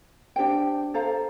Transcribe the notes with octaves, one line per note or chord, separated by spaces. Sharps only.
D4 G4 C5 G5
A4 C5 F5 A#5